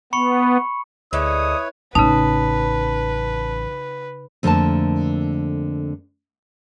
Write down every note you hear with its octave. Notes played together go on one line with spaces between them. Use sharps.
B3 B5 C#6 C#7
D2 D3 G#3 A3 E4 B4 C#5 D#6
A1 C#3 C#4 D#4 B4 A5
F2 D3 A3 A#3 A#4 A5